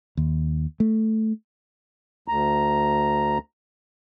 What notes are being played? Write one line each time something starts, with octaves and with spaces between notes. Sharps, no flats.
D#2
A3
D2 A#5